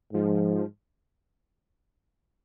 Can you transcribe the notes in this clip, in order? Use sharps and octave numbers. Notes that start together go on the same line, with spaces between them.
G#2 F3